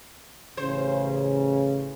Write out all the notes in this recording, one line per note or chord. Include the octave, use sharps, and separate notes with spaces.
A1 C#3 C5